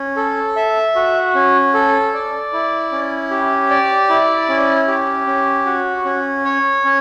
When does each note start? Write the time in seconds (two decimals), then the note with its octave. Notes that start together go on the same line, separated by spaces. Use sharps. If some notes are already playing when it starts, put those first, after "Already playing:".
Already playing: C#4
0.17 A4
0.56 E5
0.95 F#4
1.35 C#4
1.74 A4
2.14 D5
2.53 E4
2.92 C#4
3.31 G4
3.70 D5
4.09 E4
4.49 C#4
4.88 G4
5.27 C#4
5.66 F#4
6.05 C#4
6.45 C#5
6.85 C#4